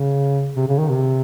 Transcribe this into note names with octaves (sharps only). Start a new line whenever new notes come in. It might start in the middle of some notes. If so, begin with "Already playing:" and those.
Already playing: C#3
C3
C#3
D#3
C3